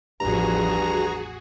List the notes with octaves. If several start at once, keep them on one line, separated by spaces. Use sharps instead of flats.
A1 E2 G2 F3 F#4 G#4 A#5